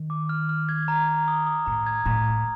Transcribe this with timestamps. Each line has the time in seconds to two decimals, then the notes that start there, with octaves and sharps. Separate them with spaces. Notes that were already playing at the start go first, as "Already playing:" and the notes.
Already playing: D#3
0.10 D6
0.29 F6
0.49 F6
0.69 G#6
0.88 A#5
1.08 G#6
1.28 D#6
1.47 D#6
1.66 A2 A#5
1.86 G#6
2.06 A2 A#5
2.25 G#6